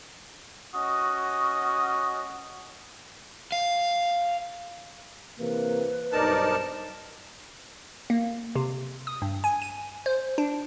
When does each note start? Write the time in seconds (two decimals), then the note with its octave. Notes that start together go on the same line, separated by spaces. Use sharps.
0.76 C#4 F#4 D#5 D#6
3.52 F5
5.39 C3 E3 A#3 B4
6.12 B1 G2 D#4 A#4 C5 D5 A5
8.10 A#3
8.56 C3
9.07 D#6
9.22 G2
9.44 G#5
9.62 D#7
10.06 C5
10.38 D4